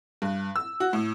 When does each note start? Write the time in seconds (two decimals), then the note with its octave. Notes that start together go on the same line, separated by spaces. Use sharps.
0.22 G2
0.56 E6
0.80 F#4
0.93 A2